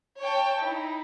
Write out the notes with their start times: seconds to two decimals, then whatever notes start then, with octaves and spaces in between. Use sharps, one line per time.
0.22 C#5 G5 A5
0.63 D#4 E4